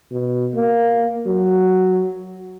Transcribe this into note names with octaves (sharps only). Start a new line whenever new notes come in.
B2
A#3
F#3